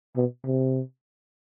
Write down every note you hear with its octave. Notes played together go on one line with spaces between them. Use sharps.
B2
C3